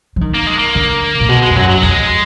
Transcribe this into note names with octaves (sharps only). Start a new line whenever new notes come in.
F3
D#3
A#3
G#3
A#3
D3
A#2
B2 G#3
G#3
F2
F#2 F#3
F#3
F2 G#3